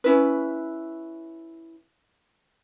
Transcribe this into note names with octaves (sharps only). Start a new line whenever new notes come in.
C#4 E4 B4